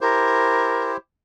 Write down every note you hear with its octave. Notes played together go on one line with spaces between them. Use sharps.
E4 G4 A#4 C5